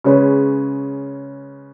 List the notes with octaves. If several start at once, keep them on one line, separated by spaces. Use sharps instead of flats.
C#3 G#3 C#4 G#4 B4